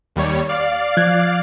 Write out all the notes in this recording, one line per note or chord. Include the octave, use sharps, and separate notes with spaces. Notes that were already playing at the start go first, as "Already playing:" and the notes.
D#2 G3 C#5
D5 F5
F3 F#6 G#6